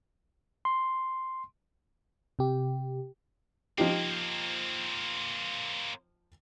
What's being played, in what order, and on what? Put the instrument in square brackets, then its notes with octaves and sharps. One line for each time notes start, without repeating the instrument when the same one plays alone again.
[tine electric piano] C6
[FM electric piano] C3 G4
[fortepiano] F3 D#4 G4 [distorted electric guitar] A#3 C4